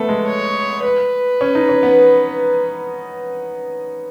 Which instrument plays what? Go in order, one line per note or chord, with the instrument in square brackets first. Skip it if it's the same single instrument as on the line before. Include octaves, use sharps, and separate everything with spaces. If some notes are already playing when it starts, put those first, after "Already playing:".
Already playing: [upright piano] A3 B3 [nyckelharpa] A4
[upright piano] G#3
[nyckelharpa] C#5
B4
[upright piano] C#4
D#4
C#4
B3